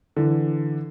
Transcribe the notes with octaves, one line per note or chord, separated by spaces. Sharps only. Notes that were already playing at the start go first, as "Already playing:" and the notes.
D3 E3